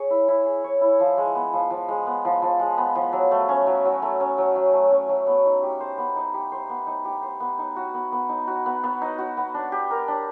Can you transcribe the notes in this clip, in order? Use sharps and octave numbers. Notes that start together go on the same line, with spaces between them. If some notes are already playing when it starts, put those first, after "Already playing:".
Already playing: G#4 C#5
E4
E4
G#4
C#5
E4
F3
G#3
B3
F3
F3
G#3
B3
F3
F3
G#3
B3
F3
F#3
A3
C#4
F#3
F#3
A3
C#4
F#3
F#3
A3
C#4
F#3
B3
D#4
G4
C5
B3
D#4
G4
C5
B3
D#4
G4
C5
B3
D#4
F#4
B3
B3
D#4
F#4
B3
B3
D#4
F#4
B3
D4
G4
A#4
D4